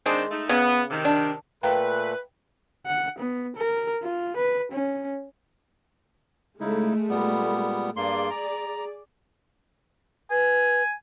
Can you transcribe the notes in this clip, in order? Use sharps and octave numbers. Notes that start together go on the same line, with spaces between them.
D#3 G#3 C4 D4
A3 D#4
C#3 B3
C3 D#3
D4
A#2 A3 B4 F5 G5 A#5
F#5
B3
A#4
F4
B4
C#4
C#3 G#3 A3 D#4 E4
A#2 G3 B3
G2 A#3 G#4 D5 C6
A#5
B4 G#5